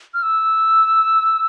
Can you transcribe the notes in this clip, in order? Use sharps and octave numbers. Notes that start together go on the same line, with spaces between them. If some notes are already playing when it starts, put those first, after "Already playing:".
F6
E6